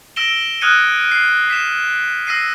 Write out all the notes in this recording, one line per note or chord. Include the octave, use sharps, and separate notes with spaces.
E6 A#6 D7 E7 G7
D#6 F6 F#6 G#6 C#7 D#7
C7
B6 C7 E7
E6 A#6 C7 D#7